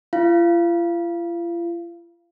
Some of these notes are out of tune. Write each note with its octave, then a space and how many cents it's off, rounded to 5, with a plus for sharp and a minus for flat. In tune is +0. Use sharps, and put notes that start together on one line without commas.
F4 -45 F5 -25